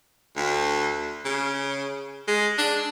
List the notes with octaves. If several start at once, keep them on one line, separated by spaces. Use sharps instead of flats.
D2
C#3
G#3
D4